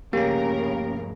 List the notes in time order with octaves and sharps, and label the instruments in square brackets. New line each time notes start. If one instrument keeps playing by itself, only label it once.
[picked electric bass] G1 F3 A3 [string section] C#3 A#4 [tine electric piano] A#3 C#4 [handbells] G4